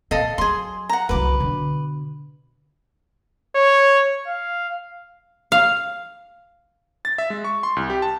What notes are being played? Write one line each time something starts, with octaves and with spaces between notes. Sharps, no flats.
A#2 A4 D#5 F5
F#3 G#4 C6
F#5 A#5
C2 F#2 B4 D6
B2 D3
C#5
F5
F5
A6
E5
G#3
C#6
C6
C2
G4
A5